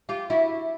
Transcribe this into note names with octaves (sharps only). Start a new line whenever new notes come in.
F4 G4
E4 F#4